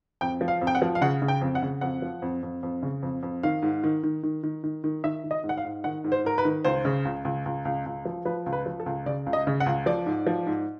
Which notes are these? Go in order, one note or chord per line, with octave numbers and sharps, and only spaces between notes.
F2 G5
F3
F5
F2
G5
F#5
F3
F5
C#3 F#5
C#3
G5
F2
F#5
C#3
F2 F#5
F3
F2
F2
F2
C#3
F2
F2
D#3 F5
G#2
D#3
D#3
D#3
D#3
D#3
D#3
D#3 E5
D#3
D#5
G#2
F#5
F5
G#2
D#3 F#5
G#2
C5
G#2 A#4
B4
D#3
C#2 C5
C#3
C#2
C#2
C#2
C#2
C#2
F3
F3 B4
C#2
B4
F3
A4
C#2
C#3 D5
C#2
D#5
C#3
F#5
C#2
F3 D5
G#2
F3
G#2